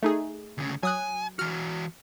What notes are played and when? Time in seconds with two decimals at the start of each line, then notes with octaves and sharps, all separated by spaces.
0.03 A3 D#4 G#4
0.58 D2 C#3
0.83 F#3 G#5 D#6 F#6
1.39 E3 F#4 F6